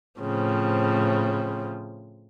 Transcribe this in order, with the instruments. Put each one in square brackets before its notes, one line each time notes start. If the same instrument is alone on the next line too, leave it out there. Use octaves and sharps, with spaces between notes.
[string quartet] A2 C#3 F3 C4